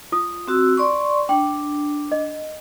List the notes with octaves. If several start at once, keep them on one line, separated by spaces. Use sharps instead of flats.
F4 D#6
C4 F#4 E6
D5 C6 C#6
D4 G5
D#5